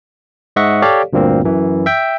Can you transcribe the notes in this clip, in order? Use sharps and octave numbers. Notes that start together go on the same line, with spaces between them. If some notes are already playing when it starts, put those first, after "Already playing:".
G#2 D#5 E5 F#5 C#6
G4 A4 C#5 D5 F5
D2 G2 A#2 A#3 C4
F#2 E3
E5 G5